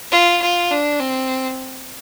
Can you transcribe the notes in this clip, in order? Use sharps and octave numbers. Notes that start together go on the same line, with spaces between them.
F4
F4
D4
C4